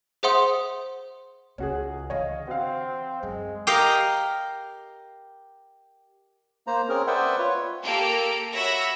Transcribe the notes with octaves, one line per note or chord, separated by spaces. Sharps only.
G#4 C5 E5 F#5 C6 D#6
C#2 C#4 F#4 G#4
D3 E3 C#5 D#5 F5
C4 F#4 F5
F#2 G#3
G4 A#4 D#5 F5
A#3 C5 A#5
C4 C#4 G#4 A#4
B4 C5 D5 E5 F#5 G5
F4 B4 C#5
A#3 G4 A4 A#5 D7
F#4 C#5 E5 B5 E6 A#6